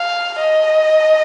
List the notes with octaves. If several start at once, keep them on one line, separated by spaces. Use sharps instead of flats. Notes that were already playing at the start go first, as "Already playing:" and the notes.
Already playing: F5
D#5